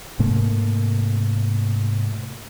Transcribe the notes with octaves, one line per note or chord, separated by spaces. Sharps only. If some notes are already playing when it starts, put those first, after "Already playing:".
G#2 C3 A3 A#3